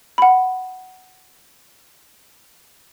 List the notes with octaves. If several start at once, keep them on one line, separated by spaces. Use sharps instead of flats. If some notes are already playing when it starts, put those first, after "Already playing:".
F#5 B5